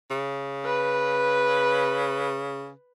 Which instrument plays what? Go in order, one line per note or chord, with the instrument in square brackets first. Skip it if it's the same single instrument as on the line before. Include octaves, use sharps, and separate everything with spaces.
[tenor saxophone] C#3
[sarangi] B4